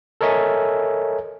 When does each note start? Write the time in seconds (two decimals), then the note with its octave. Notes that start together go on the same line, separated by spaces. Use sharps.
0.21 A4 A#4 C#5 D#5 E5 G#5